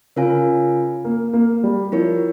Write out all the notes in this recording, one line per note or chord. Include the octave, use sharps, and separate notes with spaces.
C#3 F4 A#4 C#5 F5 G#5
A#3
A#3
G3
F3 E4 G4 A#4 C#5